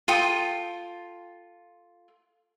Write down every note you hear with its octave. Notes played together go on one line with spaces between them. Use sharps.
F4 A4 G5 D#6